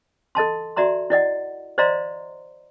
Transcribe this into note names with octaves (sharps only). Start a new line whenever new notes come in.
A4 D#5 A5 C6
F#4 D5 E5 A#5 C6
E4 D5 D#5 F#5
C5 D5 D#5 F5 A#5 C6